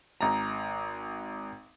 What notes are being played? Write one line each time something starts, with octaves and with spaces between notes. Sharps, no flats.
G#1 A#5